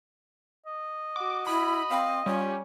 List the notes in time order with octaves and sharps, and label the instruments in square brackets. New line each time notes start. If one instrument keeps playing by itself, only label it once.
[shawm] D#5
[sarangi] F#4 [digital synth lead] D6
[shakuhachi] E4 [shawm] D#5 [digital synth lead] B5
[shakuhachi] C4 [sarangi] F5
[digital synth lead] G3 [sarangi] C#4 [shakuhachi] F4